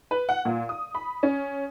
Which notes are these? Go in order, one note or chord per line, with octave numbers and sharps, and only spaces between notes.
B4
F#5
A#2
D#6
B5
C#4